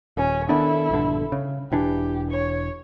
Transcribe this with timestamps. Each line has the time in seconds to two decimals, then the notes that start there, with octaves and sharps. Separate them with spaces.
0.17 D#1 C#4
0.49 D#3 B3 D4 E4 A4
0.90 A#1 G2 D3
1.32 C#3
1.72 E1 E3 D4 G4
2.31 C#5